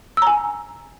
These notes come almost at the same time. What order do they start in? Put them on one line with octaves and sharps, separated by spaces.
E6 A#5 G#5